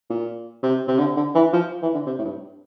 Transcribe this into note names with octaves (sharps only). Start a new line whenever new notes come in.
A#2
C3
C3
D3
D3
E3
F3
E3
D3
C3
A2
G2